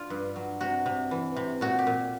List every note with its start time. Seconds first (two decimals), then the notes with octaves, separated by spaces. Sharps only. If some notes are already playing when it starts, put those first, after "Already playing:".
Already playing: D4 F4
0.10 G2
0.36 F#3
0.61 C3 F#4
0.86 C3
1.11 E3
1.36 C3
1.61 A#2 F#4
1.79 G4
1.87 A#2